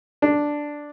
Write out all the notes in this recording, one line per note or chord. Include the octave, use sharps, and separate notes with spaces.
D4